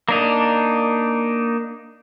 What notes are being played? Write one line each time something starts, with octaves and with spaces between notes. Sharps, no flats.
A#3 D4 D#4